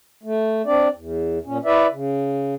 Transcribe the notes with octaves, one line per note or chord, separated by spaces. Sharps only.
A3
C4 D4 D5
E2
A#2 C#4
E4 B4 D5 E5
C#3